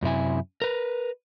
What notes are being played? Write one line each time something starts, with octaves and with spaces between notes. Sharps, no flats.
F#2 C3 E4 G#5
A#4 B4